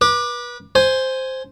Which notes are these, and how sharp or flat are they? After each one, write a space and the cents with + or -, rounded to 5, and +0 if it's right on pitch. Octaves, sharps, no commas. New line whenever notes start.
B4 -30 D6 +20
C5 +0 G#5 +0